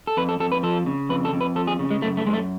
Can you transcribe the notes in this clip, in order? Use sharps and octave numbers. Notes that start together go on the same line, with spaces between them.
A4
F2 B4
A4
F2 A4
B4
F3 A4
C#3
F2 B4
A4
F2
B4
F3 A4
G#4
C#3
G#3
F#2 A3
A3
F#2 G#3
A3